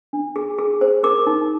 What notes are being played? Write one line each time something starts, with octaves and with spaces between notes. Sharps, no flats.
D4
G#4
G#4
C5
A#4 D6
D#4